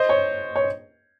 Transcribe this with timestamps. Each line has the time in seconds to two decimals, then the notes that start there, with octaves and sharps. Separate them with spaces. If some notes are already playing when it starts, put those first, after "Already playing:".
Already playing: C5 D#5
0.09 C#5
0.56 C#5